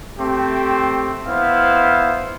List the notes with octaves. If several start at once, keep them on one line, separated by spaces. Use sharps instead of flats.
A3 C4 G4
B3 E4 C5 F5